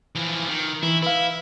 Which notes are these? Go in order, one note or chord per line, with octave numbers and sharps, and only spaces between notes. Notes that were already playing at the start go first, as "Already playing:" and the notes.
E3 F3
D#3
E3 E4
E4 B4 F5